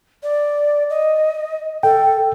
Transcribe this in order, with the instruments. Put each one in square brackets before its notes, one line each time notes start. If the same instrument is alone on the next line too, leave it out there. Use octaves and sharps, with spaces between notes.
[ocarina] D5
D#5
[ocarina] A4 [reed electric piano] G5